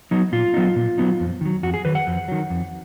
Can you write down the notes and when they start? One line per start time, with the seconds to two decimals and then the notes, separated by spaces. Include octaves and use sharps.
0.11 F#3 B3 D#4
0.32 A#2 F4
0.54 F#3 B3 D#4
0.76 A#2
0.98 F#3 B3 D#4
1.20 F2
1.41 D#3 F#3
1.63 F2 F#4
1.74 G#4
1.85 D#3 F#3 B4
1.95 F#5
2.07 F2
2.28 D#3 F#3
2.50 F2